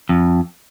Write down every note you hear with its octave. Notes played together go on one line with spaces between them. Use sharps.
F2